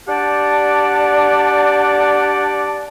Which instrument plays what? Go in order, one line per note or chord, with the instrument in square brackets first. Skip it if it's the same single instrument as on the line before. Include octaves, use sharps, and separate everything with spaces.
[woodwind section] D4 G4 D5 F#5 A5